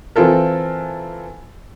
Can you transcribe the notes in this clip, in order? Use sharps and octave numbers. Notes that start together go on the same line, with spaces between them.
E3 C4 F4 A4 A#4